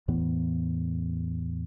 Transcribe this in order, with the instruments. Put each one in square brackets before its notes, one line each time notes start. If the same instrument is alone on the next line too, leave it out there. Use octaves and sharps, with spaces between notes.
[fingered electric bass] E2 A2 E3 B3